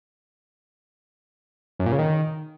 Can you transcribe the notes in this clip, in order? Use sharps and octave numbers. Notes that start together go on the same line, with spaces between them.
F#2
A#2
C#3
D#3